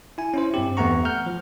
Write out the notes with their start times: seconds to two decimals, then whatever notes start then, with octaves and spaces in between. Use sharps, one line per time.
0.18 E4 G#5
0.34 C#4 E4 C5
0.54 G2 C4 G4
0.77 E2 A3 B3 F#5 A#5 C#6
1.05 F#5 F6 G6
1.26 F3